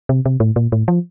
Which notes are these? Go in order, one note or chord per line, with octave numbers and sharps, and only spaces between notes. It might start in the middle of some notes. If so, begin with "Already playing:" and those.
C3
C3
A2
A#2
A2
F3